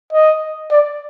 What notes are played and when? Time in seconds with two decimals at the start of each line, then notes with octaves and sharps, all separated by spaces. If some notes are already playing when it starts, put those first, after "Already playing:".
0.13 D#5
0.71 D5